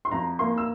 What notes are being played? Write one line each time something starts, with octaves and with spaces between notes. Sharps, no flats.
C6
F2 A#5
A#3 C6
E6